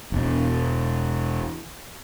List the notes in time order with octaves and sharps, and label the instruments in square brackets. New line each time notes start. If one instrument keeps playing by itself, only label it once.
[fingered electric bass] E1 B2